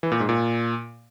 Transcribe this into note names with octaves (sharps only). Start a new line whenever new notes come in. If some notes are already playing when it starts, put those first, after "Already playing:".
E3
A#2
G#2
A#2